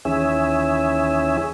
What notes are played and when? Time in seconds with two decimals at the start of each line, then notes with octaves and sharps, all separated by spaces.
0.05 D#2 E3 C#4 G#4 E5